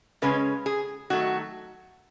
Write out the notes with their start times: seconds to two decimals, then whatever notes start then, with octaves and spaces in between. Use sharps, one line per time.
0.22 C#3 G#3 C#4 B4
0.66 G#4
1.10 D#3 F#3 A3 F#4